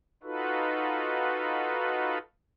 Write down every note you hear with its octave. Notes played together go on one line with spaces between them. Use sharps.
D#4 F4 F#4 A4 B4